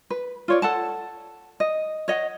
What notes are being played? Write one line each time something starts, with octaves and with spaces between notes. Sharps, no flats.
B4
F4 C#5 D5
A4 F#5 A5
D#5
C#5 D#5 F#5